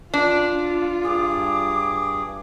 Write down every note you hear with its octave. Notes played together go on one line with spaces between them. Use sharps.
D4 F4
G2 G#4 D6